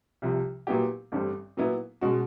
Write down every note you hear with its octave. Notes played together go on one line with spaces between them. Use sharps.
C2 C3 F3
A#2 F#3 B3 E4 G4
A1 G2 D3 G3 C4
A#2 F#3 B3 E4
B2 G#3 C#4 F#4